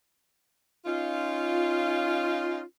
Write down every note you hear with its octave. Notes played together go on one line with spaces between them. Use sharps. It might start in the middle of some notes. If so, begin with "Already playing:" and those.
C#4 D#4 F4